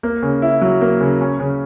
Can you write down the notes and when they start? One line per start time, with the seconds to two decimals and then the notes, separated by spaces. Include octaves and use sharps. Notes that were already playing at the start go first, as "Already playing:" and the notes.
0.03 A#3
0.22 C#3
0.42 E4
0.61 F#3
0.81 A#3
1.00 C#3
1.21 C#4
1.40 C#3